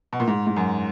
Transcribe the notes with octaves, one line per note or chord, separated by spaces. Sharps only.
B2
A#2
G#2
G#2
F#2